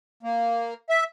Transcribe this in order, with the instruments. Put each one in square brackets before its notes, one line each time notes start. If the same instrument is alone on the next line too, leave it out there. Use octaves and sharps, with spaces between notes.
[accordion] A#3
E5